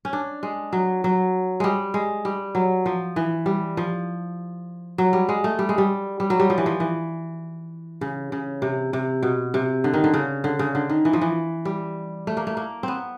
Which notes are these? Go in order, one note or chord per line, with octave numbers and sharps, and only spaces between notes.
C#4
D4
G#3
F#3
F#3
G3 G#3
G#3
G3
F#3
F3
E3
G3
F3
F#3
G3
G#3
A3
G3
G#3
G3
G3
F#3
G3
F3
E3
F3
E3
C#3
C#3
C3
C3
B2
C3
D3
D#3
D3
C#3
D3
C#3
D3
D#3
E3
F3
E3
G3
A3
A#3
A3
A#3
B3 C4